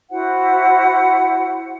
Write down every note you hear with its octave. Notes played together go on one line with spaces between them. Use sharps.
E4 F#4 C5 F#5